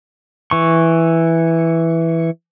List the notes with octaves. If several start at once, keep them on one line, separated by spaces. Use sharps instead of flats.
E3 C#6